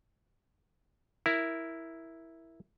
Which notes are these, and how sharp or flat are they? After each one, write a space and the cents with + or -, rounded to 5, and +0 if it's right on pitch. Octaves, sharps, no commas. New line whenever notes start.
E4 +0 A#4 +0